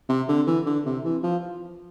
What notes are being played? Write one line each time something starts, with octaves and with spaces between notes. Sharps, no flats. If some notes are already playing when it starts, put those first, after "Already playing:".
C3
D3
E3
D3
C3
E3
F3